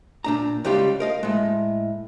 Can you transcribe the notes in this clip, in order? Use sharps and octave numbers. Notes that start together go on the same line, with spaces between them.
A#2 D4 A#5
C#2 G3 F4 G4 F5
A#4 D#5 F5
A2 G#3